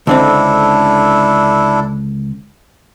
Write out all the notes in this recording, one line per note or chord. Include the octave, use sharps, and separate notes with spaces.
C#2 D3 C4 D4 E4 A4